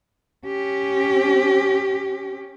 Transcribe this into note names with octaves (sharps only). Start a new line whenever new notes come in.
C#4 G4